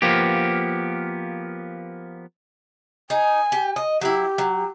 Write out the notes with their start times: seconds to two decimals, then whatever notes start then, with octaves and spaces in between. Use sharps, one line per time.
0.02 F3 A#3 B3 G4
3.10 D#4 G#5
3.52 G4
3.76 D#5
4.01 F#3 E4 G4
4.38 F#3